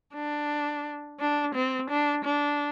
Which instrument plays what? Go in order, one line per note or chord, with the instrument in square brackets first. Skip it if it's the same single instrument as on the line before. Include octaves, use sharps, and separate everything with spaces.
[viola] D4
D4
C4
D4
D4